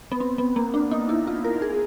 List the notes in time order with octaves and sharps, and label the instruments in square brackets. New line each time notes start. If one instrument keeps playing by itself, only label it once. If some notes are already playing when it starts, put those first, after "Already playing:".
[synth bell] B3
C4
B3
A#3
D4
D#4
E4
F4
A#4
G#4